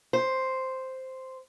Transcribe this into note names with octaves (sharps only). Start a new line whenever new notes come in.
C5